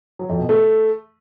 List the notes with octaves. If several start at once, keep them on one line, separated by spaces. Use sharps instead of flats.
F#3
F2
B2
A3